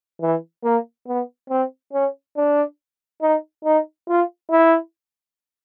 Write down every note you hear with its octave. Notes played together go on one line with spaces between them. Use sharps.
E3
A#3
B3
C4
C#4
D4
D#4
D#4
F4
E4